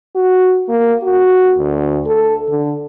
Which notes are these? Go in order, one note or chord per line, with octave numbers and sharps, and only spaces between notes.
F#4
A#3
F#4
D2
A4
D3